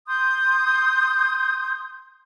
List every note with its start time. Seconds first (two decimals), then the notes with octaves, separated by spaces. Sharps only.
0.07 C6 D#6 G6